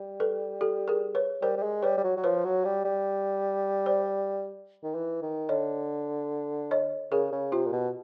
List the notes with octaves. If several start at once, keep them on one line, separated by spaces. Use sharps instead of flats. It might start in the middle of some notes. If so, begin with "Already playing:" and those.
Already playing: G3
A4 B4
G4 A4
G#4 A#4
B4 C#5
G3 A#4 C5
G3
G#3
G3 B4 C#5
G3
F#3
F#3
F3 B4 C#5
F#3
G3
G3
C5 D5
D#3
E3
D#3
D3 C#5 D#5
C#5 D#5
C#3 G#4 A#4
C#3
C3 F4 G4
A#2
B2